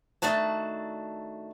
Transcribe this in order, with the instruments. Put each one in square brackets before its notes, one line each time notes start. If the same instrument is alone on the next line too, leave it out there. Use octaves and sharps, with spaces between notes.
[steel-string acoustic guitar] D#3 A3 D4 F#4 A5